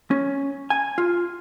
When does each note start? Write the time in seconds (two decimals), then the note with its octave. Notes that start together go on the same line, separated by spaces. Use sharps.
0.11 C#4
0.70 G#5
0.98 F4